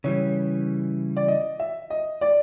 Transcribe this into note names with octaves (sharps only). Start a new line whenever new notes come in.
C#3 E3 G3 C#5
D5
D#5
E5
D#5
D5